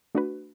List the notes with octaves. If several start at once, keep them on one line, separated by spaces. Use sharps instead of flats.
A3 D4 F#4 B4